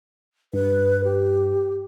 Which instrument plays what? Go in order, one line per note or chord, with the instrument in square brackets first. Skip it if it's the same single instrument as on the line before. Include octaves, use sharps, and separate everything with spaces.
[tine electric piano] G2 [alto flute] B4
[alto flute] G4